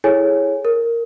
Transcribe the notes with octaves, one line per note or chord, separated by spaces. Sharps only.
E4 G#4 A4 C#5 G#5
A#4